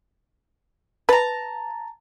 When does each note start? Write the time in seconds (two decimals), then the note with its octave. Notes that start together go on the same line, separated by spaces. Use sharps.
1.09 B4 A5 A#5